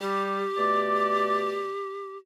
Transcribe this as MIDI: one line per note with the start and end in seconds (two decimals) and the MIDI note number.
0.01 0.45 55
0.01 2.17 67
0.58 1.70 47
0.58 1.70 57
0.58 1.70 74